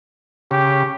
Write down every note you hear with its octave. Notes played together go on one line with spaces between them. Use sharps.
C#3 G4